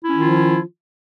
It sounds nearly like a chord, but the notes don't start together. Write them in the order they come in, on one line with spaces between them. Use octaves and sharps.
E4 C#4 D#3 F4 F3